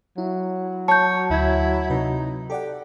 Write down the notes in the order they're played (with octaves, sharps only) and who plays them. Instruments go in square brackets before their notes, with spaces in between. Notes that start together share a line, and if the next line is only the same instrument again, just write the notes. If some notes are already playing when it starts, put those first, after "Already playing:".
[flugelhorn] F#3 [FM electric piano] E4
[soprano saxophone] C#5 [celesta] A5 G6
[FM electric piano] D2 G#6 [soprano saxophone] E4
[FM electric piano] C3 B4 [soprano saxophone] D#4
[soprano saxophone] G4 [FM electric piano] A4 D5 F#5